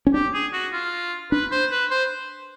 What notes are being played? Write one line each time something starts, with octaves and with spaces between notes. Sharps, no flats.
C#4
D4 G4
G#4
F#4
F4
D4 B4
C5
B4
C5